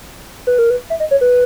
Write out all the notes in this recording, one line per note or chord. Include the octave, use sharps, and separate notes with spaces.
B4
A#4
B4
E5
D#5
C#5
B4